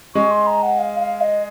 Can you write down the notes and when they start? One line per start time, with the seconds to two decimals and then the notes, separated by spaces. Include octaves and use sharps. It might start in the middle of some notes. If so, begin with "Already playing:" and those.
0.15 G#3 C#6
0.31 C6
0.47 A#5
0.63 F#5
0.79 F5
1.00 F5
1.21 D#5